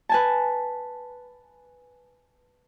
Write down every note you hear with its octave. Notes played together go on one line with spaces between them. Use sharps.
B4 G#5 A5